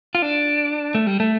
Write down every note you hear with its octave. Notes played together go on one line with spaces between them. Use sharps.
F4
D4
A3
G3
A3